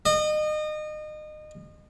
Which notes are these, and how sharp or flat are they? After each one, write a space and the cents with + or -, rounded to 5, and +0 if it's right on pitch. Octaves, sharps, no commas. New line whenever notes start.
D#5 -30